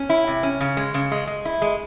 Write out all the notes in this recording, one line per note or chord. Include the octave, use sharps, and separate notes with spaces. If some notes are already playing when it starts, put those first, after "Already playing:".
Already playing: C#4
E4
C3
C#4
C#3
G#3
C#3
G#3
G#3
E4
G#3